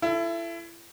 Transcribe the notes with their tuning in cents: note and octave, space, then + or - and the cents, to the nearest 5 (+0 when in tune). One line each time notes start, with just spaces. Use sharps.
E4 +30 A4 +0